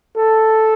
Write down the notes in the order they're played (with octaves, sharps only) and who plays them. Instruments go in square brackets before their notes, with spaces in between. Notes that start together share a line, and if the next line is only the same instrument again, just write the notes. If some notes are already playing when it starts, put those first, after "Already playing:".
[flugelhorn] A4